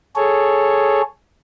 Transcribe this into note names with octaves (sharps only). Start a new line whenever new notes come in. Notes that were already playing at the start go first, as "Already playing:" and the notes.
G#4 A4 C#5